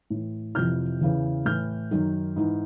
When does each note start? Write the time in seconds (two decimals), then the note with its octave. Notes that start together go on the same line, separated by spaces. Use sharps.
0.10 A2 E3
0.55 F2 C3 E3 F6 G6
1.01 E2 C#3 E3
1.46 A2 E3 F6 G6
1.91 F#2 D#3
2.36 G#2 E3